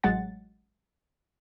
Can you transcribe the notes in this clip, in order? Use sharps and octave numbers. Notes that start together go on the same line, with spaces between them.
A1 F#3 G#3 F#5 A6